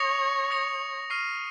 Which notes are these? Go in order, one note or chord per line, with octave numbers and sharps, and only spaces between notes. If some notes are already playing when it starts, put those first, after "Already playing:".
Already playing: C#5 D#6 A#6 C#7 F7
D#6 A#6 C#7 F7
C#6 F6 C7 D#7